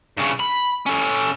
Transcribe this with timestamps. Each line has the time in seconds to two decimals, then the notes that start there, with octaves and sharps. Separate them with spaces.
0.18 G2 C#3
0.40 B5
0.86 C#4 A4